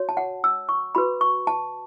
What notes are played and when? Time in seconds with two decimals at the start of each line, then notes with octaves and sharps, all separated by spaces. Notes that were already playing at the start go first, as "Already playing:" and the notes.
Already playing: F#4 C#5
0.09 A5
0.17 F#5
0.44 E6
0.69 C#6
0.95 F#4 B4 B5
1.21 C#6
1.47 A5